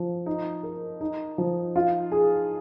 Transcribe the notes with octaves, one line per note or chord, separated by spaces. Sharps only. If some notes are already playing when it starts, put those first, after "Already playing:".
Already playing: F3
D#4
A#4
D#4
F3
F4
G#4